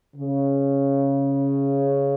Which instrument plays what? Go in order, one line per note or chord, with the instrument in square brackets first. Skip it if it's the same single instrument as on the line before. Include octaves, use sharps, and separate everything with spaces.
[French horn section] C#3